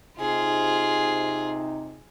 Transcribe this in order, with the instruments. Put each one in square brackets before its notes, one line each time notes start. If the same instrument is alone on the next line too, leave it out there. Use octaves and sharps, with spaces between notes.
[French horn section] C3 D#4 [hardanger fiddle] F4 G#4